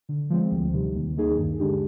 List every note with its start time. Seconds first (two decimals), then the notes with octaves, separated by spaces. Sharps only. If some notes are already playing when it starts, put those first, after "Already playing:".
0.09 D3
0.30 F3 G#3 C4
0.51 D2
0.73 C3 D#3 G3
0.94 D#2
1.16 D#3 A#3 D#4 G#4
1.38 G2
1.59 D3 G#3 D4 G4